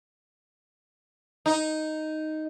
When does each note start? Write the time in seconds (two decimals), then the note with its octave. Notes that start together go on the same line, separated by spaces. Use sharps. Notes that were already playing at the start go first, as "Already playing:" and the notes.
1.46 D#4